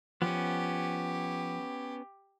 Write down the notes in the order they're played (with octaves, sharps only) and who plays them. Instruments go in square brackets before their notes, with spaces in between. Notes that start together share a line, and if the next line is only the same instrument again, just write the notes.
[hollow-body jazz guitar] F3 [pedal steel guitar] B3 C#4 [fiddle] G4